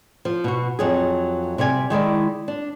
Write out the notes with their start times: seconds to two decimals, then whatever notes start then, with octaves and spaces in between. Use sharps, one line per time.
0.25 F3
0.44 B2 F#4
0.79 F2 F#3 G#4
1.58 C3 G3 D5 G#5
1.90 D#3 G#3 E4 D5
2.48 D4